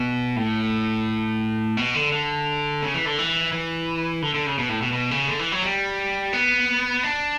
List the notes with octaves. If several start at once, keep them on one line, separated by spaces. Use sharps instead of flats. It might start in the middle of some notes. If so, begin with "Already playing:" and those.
Already playing: B2
A2
B2
D3
D3
C#3
E3
D3
E3
E3
D3
D3
C#3
B2
A2
B2
B2
C#3
D3
E3
F#3
G3
B3
D4